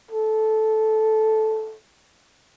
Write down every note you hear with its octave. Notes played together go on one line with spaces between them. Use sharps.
A4